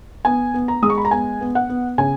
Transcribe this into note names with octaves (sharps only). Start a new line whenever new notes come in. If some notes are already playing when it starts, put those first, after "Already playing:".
B3 G#5
B3
A#5
G#3 D#6
C#6
B5
A#5
B3 G#5
B3
F#5
B3
C#3 G#5